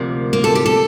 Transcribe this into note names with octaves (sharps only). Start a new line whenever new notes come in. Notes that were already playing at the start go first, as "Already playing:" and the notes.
Already playing: D2 C3 F3 A#3
A#3
A4
G4
A4